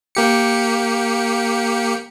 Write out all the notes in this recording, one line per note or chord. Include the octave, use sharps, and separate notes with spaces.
A#3 G4 C#7